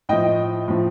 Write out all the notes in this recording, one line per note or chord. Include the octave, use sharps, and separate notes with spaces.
A2 F3 D#5 G5
A2 F3